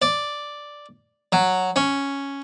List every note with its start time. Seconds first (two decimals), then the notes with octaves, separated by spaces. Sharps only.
0.02 D5
1.32 F#3
1.76 C#4